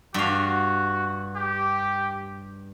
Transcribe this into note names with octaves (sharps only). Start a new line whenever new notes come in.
G2 F#4 F5
G4